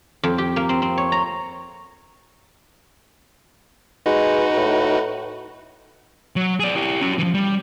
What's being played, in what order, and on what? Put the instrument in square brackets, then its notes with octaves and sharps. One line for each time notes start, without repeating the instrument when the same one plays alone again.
[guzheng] F2
G4
A#3
C4
C4
C#5
A#5
[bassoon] G#3 [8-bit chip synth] D#4 F#4 B4
[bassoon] A2
[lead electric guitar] F#3
G#4 D5
E4 G4
C#4 F#4
E3 F3
G3